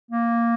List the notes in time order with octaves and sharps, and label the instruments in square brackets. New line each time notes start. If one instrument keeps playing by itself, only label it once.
[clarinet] A#3